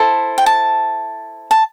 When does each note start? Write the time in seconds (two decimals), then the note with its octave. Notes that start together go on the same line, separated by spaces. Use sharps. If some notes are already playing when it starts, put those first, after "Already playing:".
Already playing: E4 A4 C5
0.38 G5
0.46 A5
1.51 A5